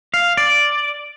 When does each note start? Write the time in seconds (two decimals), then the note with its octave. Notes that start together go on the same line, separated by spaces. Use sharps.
0.14 F5
0.37 D5